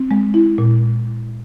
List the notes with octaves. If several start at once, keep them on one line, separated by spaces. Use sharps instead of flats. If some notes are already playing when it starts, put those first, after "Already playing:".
Already playing: C4
G#3
E4
A#2